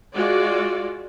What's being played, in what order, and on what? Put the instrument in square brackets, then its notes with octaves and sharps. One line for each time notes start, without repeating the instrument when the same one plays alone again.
[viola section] G#3 F4 F#4 D5